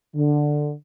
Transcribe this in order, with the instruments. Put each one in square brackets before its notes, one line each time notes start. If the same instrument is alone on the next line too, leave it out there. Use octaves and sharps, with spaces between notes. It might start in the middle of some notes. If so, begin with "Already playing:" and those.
[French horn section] D3